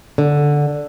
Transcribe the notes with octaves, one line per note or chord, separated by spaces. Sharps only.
D3